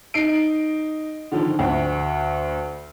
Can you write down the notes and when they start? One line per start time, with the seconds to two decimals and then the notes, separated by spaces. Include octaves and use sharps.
0.14 D#4 C7 D7
1.32 D3 D#3 F3
1.59 D2